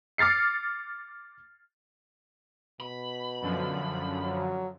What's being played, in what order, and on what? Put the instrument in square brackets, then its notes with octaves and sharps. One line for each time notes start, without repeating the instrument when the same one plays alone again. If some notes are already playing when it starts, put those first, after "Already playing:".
[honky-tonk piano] D6 F6 A6 C7 C#7
[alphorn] B2 [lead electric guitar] B5
[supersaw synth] F#2 D3 F3
[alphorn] F#3